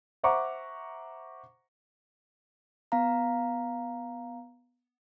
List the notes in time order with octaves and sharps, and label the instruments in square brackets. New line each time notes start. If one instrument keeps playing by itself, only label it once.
[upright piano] C5 E5 F#5 A#5 C#6 D6
[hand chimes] B3 F5 A#5